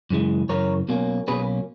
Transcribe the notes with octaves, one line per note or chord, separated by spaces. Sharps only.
F#2 C#3 E3 G#3
F#2 C#3 E3 A#4 C#5
B1 B2 A#3 C#4
B1 B2 A#3 C#4 G#4 B4